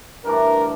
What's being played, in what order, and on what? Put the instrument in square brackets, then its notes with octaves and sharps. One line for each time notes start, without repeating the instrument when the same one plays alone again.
[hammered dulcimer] G2 E3 A3 D4 [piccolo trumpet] A#4